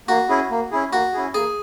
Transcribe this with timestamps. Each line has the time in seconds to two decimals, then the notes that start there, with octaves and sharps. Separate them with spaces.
0.08 A#3 F#4
0.29 C#4 E4 G#4
0.51 A#3
0.71 C#4 E4 G#4
0.92 A#3 F#4
1.13 C#4 E4 G#4
1.34 A#3 G#4